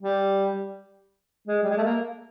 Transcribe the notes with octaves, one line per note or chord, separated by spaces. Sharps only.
G3
G#3
G3
G#3
A3
A#3